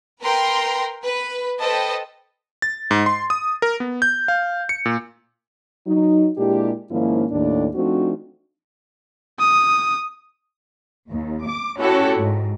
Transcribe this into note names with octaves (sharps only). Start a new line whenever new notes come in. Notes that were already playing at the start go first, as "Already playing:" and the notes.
A#4 B4 G5 A#5 C6
B4
A4 B4 C5 D#5 G5 A5
A6
G#2
C6
D#6
A#4
B3
G6
F5
C#7
A#2
F#3 D#4
A#2 G#3 D4 E4 G4
G#2 D#3 F3 A#3 C#4 E4
D#2 A2 D4
F3 A3 C4 D4 D#4 F#4
D#6
D#2
D6
C#4 E4 F#4 G4 A4 C#5
G#2